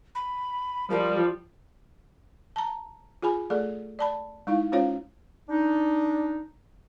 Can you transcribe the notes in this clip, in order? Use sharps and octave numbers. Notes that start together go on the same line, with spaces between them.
B5
F3 G3 A#4
A5 A#5
F4 G#4 G#5 B5
A3 G#4 A4 D5
D5 A5 B5
G#3 D#4 E4 F5
G#3 C#4 F4 C5 C#5 F5
D4 D#4